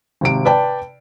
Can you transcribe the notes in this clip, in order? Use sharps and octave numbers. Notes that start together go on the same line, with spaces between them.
G#1 C3 D7
B4 D5 G5 A5